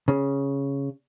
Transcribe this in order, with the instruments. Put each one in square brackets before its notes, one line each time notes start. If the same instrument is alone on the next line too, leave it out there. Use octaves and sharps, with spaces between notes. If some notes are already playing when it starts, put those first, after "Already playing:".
[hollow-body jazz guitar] C#3